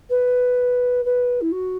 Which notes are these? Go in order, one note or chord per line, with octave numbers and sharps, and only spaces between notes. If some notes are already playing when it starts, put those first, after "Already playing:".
B4
B4
E4
F#4